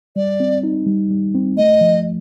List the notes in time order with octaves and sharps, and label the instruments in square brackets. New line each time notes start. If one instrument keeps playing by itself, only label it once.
[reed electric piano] G3 [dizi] D5
[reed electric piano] C4
D#4
G3
G3
C4
[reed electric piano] A3 [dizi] D#5
[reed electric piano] F3